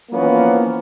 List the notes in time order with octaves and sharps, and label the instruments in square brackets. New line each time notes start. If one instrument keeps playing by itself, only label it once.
[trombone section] E3 F3 A#3 B3 C#4